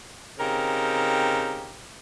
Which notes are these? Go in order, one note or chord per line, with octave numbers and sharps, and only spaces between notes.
C#3 C4 D#4 G4 A#4 F5